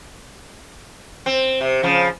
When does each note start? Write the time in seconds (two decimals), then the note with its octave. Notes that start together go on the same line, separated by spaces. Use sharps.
1.26 C4
1.61 C3
1.83 C#3 F3